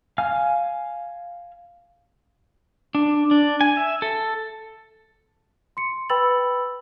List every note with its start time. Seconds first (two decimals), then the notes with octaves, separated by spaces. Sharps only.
0.18 F5 G#5 F6
2.95 D4
3.31 D4
3.61 G#5
3.77 E5
4.02 A4
5.77 C6 C#7
6.10 B4 G5 B5 E6 A6 F#7